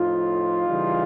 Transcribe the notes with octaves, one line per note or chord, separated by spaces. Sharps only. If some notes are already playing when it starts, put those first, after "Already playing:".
Already playing: A2 F3 D#4 F4
C#3 E3 G3